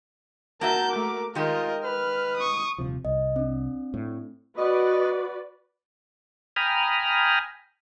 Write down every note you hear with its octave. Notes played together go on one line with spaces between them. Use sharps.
A#3 F#4 A#4 E5 A5 G6
A3 D6
D#3 G#3 F4 G4 A#4 D#5
B4 F6
C#6 D#6
D#1 C3 F3
C2 D#5
C4 D4
A2
B3 C#4 F#4 B4 D5 D#5
G5 G#5 A#5 B5 D#6 F6